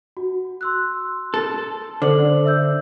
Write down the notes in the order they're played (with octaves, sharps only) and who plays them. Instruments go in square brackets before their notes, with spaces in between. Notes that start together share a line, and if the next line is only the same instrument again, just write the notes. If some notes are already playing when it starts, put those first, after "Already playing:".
[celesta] F#4
C6 E6 F#6
[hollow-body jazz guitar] A4
[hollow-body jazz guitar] D3 [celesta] A4 C5 F#7
[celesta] E5 E6 G6